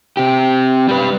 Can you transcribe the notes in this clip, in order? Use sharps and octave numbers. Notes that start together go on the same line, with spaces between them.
C3 G4
G3 B4